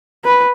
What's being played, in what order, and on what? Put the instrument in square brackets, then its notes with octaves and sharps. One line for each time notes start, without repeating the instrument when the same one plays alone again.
[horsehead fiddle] B4